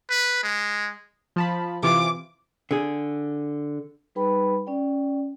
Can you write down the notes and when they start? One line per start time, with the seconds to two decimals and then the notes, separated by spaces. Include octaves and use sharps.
0.10 B4
0.43 G#3
1.36 F3 A5 B5
1.83 C3 E3 F4 D6
2.71 D3 G#4
4.15 G3 D#4 G#4 B4 G5 B5
4.67 C#4 D5 G5